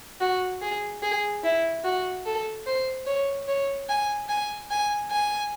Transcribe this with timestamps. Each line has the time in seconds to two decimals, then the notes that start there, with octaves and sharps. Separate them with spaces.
0.20 F#4
0.61 G#4
1.02 G#4
1.44 E4
1.84 F#4
2.25 A4
2.66 C5
3.06 C#5
3.47 C#5
3.89 G#5
4.29 G#5
4.71 G#5
5.11 G#5